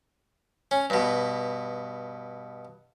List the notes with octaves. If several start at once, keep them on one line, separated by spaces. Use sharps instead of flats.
C#4
G2 B2